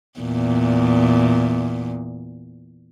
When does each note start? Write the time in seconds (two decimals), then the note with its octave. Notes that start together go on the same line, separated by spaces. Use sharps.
0.20 E2 A#2